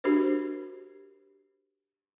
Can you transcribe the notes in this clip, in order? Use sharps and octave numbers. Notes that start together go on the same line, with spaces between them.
D4 F#4 G4 A#4 C5